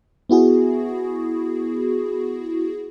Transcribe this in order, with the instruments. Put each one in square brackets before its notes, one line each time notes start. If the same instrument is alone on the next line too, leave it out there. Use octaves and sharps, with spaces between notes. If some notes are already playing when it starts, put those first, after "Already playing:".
[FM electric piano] B3 E4 F#4 G#4